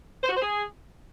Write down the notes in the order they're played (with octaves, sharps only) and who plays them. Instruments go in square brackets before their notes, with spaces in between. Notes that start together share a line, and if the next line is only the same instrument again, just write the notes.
[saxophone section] C5
F#4
C5
G#4